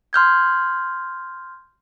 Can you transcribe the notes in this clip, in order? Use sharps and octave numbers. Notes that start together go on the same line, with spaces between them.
C6 F6 G6 G#6